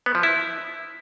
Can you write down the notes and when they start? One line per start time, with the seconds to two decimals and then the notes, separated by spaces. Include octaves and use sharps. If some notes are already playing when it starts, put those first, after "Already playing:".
0.06 B3
0.15 F3
0.23 E4